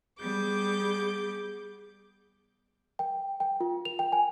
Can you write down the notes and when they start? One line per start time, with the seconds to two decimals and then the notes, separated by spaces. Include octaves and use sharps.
0.21 G3 B3 G#4 D6 G6
2.99 G5
3.40 G5
3.61 F4
3.85 F7
3.99 G5
4.12 G#5